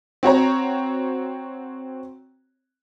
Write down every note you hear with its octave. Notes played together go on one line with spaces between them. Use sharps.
C4 F#4 C#5 A#5